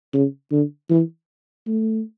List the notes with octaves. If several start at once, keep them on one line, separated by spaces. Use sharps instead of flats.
C#3
D3
E3
A3